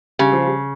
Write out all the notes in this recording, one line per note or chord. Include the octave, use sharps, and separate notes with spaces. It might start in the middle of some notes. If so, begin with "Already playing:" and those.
C#3 G3
F3
G3